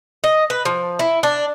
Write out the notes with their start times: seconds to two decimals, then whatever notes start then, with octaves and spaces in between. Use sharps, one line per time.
0.24 D#5
0.50 B4
0.65 F3
0.99 E4
1.23 D4